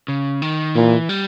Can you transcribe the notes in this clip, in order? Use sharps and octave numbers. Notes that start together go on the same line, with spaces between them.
C#3
D#3
A#2 E3
G3